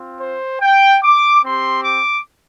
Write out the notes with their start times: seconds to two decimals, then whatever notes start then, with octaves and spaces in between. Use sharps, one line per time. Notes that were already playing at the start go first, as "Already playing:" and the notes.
Already playing: C4 F4
0.20 C5
0.61 G5
1.03 D6
1.44 C4 G4 C6
1.84 D6